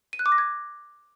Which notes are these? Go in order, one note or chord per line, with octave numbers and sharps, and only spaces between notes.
D#7
F#6
D6
A#6
G#6